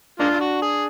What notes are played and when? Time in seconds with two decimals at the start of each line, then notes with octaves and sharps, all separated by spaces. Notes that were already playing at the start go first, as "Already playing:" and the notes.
0.20 G#3 A#3 D4 F4
0.41 F#4
0.62 G#4